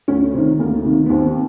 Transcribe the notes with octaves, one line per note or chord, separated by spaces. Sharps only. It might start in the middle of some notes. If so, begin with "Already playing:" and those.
D2 C#4
C3 D#3 C4
D2 A#3
C3 D#3
B3
D#2 C4